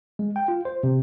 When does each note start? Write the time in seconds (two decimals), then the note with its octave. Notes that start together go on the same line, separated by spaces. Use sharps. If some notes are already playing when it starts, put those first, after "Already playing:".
0.19 G#3
0.36 G5
0.48 F4
0.65 C5
0.83 C3